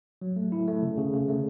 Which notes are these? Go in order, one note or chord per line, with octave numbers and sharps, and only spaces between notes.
F#3
A3
E4
A3
C#3
C#3
C#3
A3